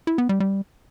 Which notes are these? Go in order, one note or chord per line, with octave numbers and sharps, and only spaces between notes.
E4
B3
G3
G3